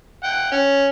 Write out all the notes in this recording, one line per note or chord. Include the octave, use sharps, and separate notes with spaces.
F#5 G5
C#4